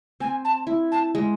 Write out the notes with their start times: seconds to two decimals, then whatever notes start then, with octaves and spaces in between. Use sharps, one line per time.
0.20 C4 G#5
0.44 A5
0.67 E4
0.91 A5
1.15 G#3